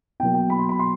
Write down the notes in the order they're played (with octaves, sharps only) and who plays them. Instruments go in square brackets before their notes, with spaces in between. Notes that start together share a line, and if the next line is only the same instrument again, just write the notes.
[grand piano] B2 G5
F#3 A#3
G5
B5
C6
B5
C6